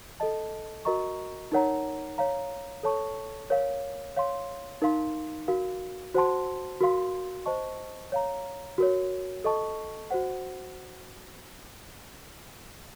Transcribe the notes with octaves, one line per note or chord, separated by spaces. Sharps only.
A4 D#5 A5
F#4 A#4 D#5 A#5 C#6
D#4 A#4 C#5 F#5 A#5
C#5 F5 A#5
A4 C#5 A5 C#6
A#4 C#5 F5
C#5 F5 C6
D#4 A#4 F5 C6
F#4 A#4 F5
F#4 C5 F#5 A5 C6
F#4 A#4 F5 C6
C5 D#5 A5 C#6
C#5 F5 A#5
F#4 A#4 C#5
A4 D#5 A5 C#6
F#4 C5 F#5